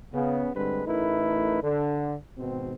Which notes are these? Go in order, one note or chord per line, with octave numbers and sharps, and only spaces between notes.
C#3 B3
G2 D3 G3 G#3 C4 B4
A1 A3 D#4 E4 A#4 B4
D3
G#1 B2 C4